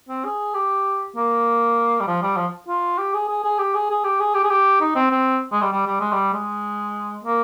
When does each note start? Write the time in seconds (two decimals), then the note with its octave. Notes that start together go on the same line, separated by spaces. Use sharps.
0.09 C4
0.25 G#4
0.54 G4
1.16 A#3
2.00 G3
2.07 F3
2.22 G3
2.37 F3
2.68 F4
2.98 G4
3.14 G#4
3.29 G#4
3.44 G#4
3.59 G4
3.74 G#4
3.90 G#4
4.04 G4
4.20 G#4
4.35 G4
4.44 G#4
4.50 G4
4.81 D#4
4.95 C4
5.11 C4
5.52 G#3
5.62 G3
5.72 G3
5.87 G3
6.00 G#3
6.13 G3
6.33 G#3
7.24 A#3